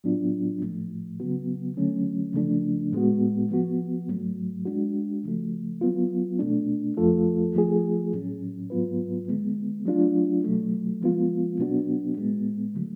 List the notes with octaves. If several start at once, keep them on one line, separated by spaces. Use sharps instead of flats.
A2 F#3 B3 D4 F4
A2 F3 A3
C#3 F#3 B3 F#4
D3 F#3 A3 C#4
C#3 F3 A3 D4
A2 G#3 B3 F#4
F3 B3 F#4
G#2 F#3 A3
G#3 D4 F#4
C#3 F3 A3
F#3 B3 F4
B2 A3 D4
F2 F3 A3 F4 A4
F3 A3 F4 G#4
A2 F#3 C#4
G#2 F#3 B3 F4 B4
D3 G#3 B3
F#3 A3 D4 F4
B2 F#3 A3
F3 G#3 B3 F4
B2 F#3 B3 D4 F#4
A2 G#3 B3
D3 F#3 A3